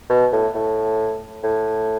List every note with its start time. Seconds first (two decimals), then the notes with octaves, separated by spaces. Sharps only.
0.10 B2
0.32 A2
0.55 A2
1.43 A2